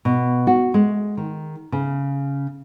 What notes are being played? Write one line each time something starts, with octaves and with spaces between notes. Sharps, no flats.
B2
F#4
G#3
D#3
C#3